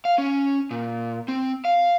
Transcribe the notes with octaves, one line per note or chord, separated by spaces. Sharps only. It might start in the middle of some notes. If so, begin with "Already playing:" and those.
F5
C#4
A#2
C4
F5